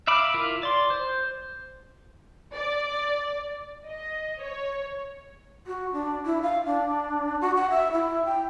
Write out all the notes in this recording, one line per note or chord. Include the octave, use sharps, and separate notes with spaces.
E5 F5 B5 D6
E4 F4 A#4
D5 C6
C5
D5
D#5
C#5
F#4
D4
E4
F5
D4
F#4
F#5
E5
E4
G5